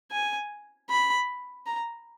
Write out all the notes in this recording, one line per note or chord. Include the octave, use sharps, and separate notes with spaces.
G#5
B5
A#5